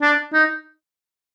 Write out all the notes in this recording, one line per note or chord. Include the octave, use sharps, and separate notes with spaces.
D4
D#4